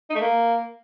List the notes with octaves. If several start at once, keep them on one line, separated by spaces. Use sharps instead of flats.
D#4
A3
A#3